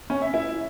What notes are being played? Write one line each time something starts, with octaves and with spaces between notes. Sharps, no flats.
C#4
E5
E4